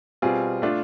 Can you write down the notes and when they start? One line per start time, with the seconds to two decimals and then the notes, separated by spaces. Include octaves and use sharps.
0.22 B2 G3 C4 F4 G#4
0.62 A3 D4 F4